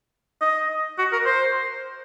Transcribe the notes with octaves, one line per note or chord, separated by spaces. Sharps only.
D#5
F#4
A#4
C5